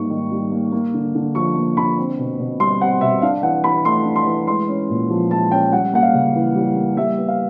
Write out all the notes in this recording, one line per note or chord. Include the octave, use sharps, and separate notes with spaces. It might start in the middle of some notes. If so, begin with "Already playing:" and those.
Already playing: G#2 G3 A#3 C#6
D#3
G3
A#3
A#3
D3
D3
F3 C#6
A#3
D3 B5
C4
B2
B2
G3 C6
C4 F#5
B2 E5
D4 F5
E3 F#5
E3 B5
A3 C6
D4
C6
E3
G#3 C6
C#4
A#2
F3
G#3 A5
C#4 G5
G3 F#5
A#3 F#5
F5
C#3
E3
G3
A#3
G3 E5
B3
F5